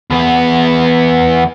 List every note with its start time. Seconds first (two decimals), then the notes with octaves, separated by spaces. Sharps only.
0.10 E2 B3